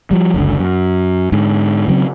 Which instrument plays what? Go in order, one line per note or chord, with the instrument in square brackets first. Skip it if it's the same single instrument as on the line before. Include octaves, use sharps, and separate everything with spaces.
[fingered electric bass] F3 G3
F#1 C#2 D3
F#2
G#2 D3
C#3 F#3 C4